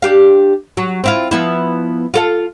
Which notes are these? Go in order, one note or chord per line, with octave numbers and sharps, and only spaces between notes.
D4 G4 F5
F#3
C4 E4 F4
F3 B3 E4
F4 A4 F5